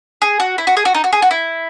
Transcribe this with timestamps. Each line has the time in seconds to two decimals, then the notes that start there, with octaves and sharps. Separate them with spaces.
0.22 G#4
0.40 F#4
0.58 E4
0.67 F#4
0.77 G#4
0.85 F#4
0.95 D#4
1.04 F#4
1.13 G#4
1.22 F#4
1.31 E4